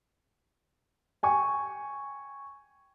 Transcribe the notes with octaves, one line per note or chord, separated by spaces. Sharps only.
G5 G#5 C#6